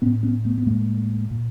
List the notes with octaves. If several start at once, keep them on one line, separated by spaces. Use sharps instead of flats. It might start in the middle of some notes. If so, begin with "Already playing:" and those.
A2 B3 C#4
B3 C#4
A3 B3
B3
A2 G#3 A#3
A#2